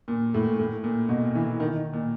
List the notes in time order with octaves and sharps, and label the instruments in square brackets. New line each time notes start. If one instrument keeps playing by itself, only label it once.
[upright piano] A#2
A2
A2
A#2
B2
E3
D#3
A#2